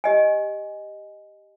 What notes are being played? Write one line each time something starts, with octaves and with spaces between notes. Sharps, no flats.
G4 D#5 G#5